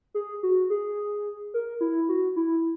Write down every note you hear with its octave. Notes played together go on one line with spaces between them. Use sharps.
G#4
F#4
G#4
A#4
E4
F#4
E4